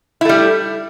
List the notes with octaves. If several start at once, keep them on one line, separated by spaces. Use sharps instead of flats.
G3 A3 E4